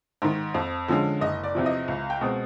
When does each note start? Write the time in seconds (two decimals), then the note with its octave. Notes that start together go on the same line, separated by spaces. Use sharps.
0.22 G#2 D#3
0.55 F2
0.88 D3 F3 G#3 C#4
1.21 F#1 D#5
1.44 D5
1.55 E2 C3 F3
1.66 D#5
1.88 C#2
2.10 G5
2.21 B2 G#3 C4